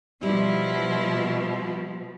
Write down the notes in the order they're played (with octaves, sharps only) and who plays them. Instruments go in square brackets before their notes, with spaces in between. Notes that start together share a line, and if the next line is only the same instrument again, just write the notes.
[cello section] B2 F3 [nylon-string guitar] G3 [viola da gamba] E4 F4